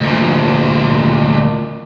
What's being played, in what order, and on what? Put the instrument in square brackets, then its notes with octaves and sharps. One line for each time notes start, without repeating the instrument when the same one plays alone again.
[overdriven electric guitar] D2 A#2